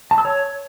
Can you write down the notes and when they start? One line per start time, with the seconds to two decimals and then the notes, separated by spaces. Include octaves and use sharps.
0.11 A5
0.18 E6
0.25 C#5